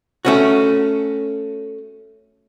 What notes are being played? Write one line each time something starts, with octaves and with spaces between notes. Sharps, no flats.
A3 C#4 F#4